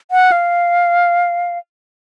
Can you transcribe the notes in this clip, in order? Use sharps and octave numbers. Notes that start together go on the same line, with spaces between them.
F#5
F5